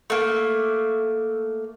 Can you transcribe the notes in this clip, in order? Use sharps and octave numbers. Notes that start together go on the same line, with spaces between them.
A3 A#3